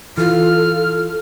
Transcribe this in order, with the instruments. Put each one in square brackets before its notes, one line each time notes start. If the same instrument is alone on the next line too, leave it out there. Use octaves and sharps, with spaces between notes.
[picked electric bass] E3 [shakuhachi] F4 [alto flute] A4 [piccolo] F6